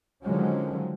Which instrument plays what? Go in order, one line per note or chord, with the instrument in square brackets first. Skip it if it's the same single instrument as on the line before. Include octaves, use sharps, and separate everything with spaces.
[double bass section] D3 D#3 F3 F#3 G#3 C#4